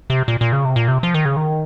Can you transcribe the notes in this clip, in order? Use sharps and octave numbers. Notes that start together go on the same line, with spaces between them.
C3
A#2
A#2
C#3
C3
A#2
C3
F3
D#3
C#3
D#3